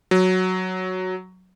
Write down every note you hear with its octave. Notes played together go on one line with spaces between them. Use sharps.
F#3